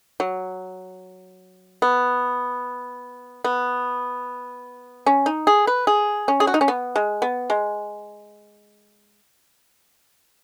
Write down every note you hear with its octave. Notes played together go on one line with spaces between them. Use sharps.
F#3
B3
B3
C#4
D#4
G#4
B4
G#4
C#4
G#4
F#4
D#4
C#4
B3
G#3
B3
G#3